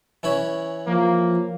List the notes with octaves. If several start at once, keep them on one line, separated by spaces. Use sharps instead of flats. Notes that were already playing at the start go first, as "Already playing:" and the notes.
E3 C#4 B5
F3 A#3